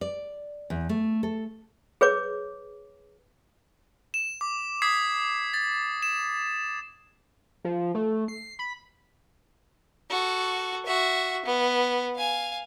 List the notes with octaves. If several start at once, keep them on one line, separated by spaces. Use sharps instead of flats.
D5
E2
A3
A4
G#4 B4 C#5 D6
E7
D6
D6 D#6 G#6 B6 C7
A6
E7
F3
A3
C7
B5
F#4 A4
F#4 E5
B3
F5 G#5